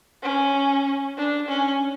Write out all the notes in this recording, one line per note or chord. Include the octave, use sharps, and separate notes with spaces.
C#4
D4
C#4